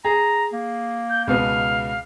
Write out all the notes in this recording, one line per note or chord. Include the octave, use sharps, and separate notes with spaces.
G#4 A#5
A#3
G6
C#2 B2 B3 F5